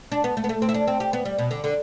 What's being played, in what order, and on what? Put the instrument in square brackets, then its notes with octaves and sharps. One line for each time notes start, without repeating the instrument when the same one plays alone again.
[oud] D4
B3
A3
B3
A3
C4
E4
D4
C4
G4
B3
G3
B2
D3
D3